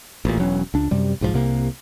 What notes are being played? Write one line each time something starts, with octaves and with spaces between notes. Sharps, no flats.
A1 A#2
E1 F#3 C#4
C#2 D4
F#2 C3 G3
B1 G#2 D#3 F3
C2 C3 A#3